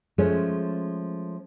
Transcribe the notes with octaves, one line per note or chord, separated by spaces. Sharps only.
F3 G#3 A3 C#4